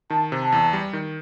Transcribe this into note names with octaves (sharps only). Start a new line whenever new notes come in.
D#3 A5
C3
A5
E2
G3
D#3